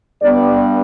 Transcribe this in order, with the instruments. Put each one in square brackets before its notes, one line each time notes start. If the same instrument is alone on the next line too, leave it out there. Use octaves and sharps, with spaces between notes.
[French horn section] G2 G3 B3 D4 D5